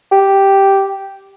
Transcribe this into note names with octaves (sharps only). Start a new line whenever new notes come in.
G4